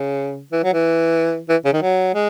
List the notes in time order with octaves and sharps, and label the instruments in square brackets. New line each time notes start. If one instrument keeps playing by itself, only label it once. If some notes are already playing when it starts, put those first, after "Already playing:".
Already playing: [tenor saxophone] C#3
E3
F#3
E3
E3
C#3
D#3
F#3
G#3